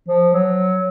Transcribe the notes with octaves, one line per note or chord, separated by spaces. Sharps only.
F3
F#3